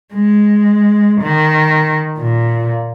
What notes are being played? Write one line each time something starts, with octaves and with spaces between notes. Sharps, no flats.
G#3
D#3
A#2